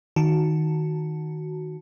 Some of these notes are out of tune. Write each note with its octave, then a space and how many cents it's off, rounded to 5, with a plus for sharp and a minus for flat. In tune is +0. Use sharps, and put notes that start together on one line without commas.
D#3 +0 F#4 +0 A5 +0